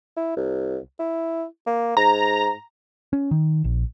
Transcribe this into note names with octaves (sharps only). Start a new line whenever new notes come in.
E4
C2
E4
A#3
G#2 A#5
C#4
D#3
A#1